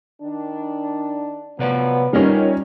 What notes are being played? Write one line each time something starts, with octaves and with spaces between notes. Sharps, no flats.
D#3 D4
C3 F3 F#3 B3 B4 D5
G3 C#4 D#4 F4 A#4 D#5